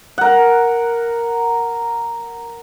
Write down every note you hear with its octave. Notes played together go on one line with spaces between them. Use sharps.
A#4 F#5